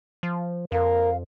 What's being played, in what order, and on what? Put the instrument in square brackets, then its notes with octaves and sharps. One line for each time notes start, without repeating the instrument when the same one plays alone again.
[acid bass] F3
[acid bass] F2 [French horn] A#4 [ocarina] F5